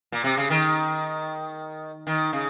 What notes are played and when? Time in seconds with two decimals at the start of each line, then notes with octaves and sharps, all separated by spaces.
0.12 A#2
0.24 C3
0.37 C#3
0.50 D#3
2.07 D#3
2.33 C#3